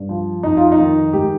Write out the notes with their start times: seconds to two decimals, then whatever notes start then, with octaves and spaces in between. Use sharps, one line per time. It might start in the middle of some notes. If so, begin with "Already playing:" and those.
Already playing: G2
0.09 F3
0.43 F2 D#4
0.57 F4
0.72 D#4
0.78 D#3
1.13 G#2 G4